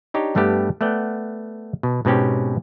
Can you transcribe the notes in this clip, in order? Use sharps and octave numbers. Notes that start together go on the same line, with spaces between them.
D4 D#4 G4 C#5
G2 G3 A3 B3 G4
A3 B3 D5 F#5 G5
B2
G#2 B2 C4 C#4 G4